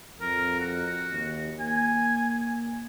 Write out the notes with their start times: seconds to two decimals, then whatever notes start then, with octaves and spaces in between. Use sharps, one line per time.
0.21 F2 A#4
0.60 F#4
1.12 D#2
1.60 A#3 G#5